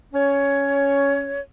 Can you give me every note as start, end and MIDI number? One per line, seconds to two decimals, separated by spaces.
0.14 1.40 61
0.14 1.40 73